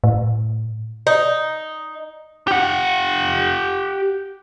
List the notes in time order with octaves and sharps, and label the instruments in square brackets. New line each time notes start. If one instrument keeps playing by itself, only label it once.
[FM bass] A2
[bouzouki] D#4
[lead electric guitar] G4 F#5